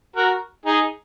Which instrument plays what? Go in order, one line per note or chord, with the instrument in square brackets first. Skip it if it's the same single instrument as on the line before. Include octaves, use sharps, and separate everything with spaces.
[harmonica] F#4 A#4
D#4 G#4